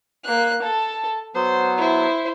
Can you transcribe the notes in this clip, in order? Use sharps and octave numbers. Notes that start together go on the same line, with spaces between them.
A#3 F#6
A4 A5
F#3 B3 C5
E4 C5